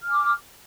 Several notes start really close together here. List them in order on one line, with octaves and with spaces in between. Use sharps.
F6 G#5 D6